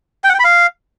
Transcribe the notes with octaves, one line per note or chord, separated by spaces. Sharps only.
G5
F#5
G5
B5
F5